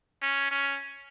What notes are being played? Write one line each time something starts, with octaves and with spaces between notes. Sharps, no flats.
C#4
C#4